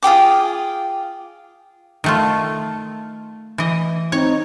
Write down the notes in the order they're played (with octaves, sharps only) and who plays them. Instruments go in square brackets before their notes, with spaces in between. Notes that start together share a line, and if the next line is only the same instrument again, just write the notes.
[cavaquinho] F4 G#4 G5 D6
[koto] D#3 A3 F4
E3 D#5
[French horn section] C4 D#4 [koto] C#5